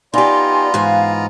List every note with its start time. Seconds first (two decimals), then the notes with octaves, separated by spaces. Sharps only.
0.14 B3 D#4 F4 G4 D5 G#5 A#5 C6
0.74 G#2 E3 F5 G#5